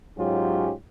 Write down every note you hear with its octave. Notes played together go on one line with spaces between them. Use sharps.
G#2 F#3 C#4 F4 G4